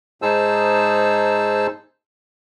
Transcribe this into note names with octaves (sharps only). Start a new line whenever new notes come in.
G#2 D#4 G#4 C5 A5 E6